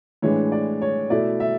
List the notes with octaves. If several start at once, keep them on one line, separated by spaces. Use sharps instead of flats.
A2 E3 G#3 D4 C#5
D5
C#5
B2 A3 E4 D5
E5